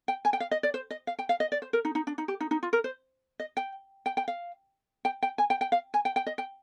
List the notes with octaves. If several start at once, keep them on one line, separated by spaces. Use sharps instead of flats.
G5
G#5
G5
F5
D#5
D5
C5
D#5
F5
G5
F5
D#5
D5
C5
A#4
D#4
D#4
D4
D#4
G4
D#4
D#4
F4
A#4
C5
D#5
G5
G5
G5
F5
G5
G5
G#5
G5
G5
F5
G#5
G5
G5
D#5
G5